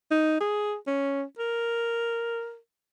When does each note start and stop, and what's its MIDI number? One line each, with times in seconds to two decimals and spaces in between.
0.11 0.40 63
0.41 0.75 68
0.87 1.23 61
1.39 2.57 70